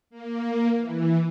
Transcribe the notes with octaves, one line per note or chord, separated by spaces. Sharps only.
A#3
E3